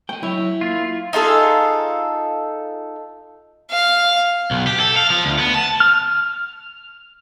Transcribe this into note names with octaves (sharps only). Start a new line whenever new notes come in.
A3 D#5 G5
F#3 E4 C#5
A#3 F4
D#4 F4 G#4 A4
F5
B1
G4
A4
F5
F3
D2
B3
A5
F6